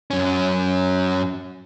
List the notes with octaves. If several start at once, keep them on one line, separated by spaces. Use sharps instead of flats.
F#2 C#4